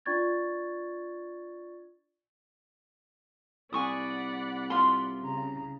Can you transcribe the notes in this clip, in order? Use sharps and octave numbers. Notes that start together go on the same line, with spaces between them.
D4 F4 D5 C#6 G#6 A6
C2 D5 F#5 G#5 B5 C#6 D#6
F4 C6
C#3 A#5